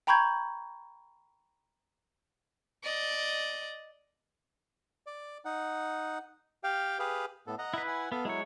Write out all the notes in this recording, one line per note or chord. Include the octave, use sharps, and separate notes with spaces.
G5 A#5 B5 C#6 G6 G#6
D5 D#5
D5
D#4 F#5
G4 F5 G5
G4 G#4 B4 F5
A2 B3 A4
D#5 F#5 A#5
E4 B4
F#5 G#5
B3 A4 F5
F#3 G#3 E4 C#5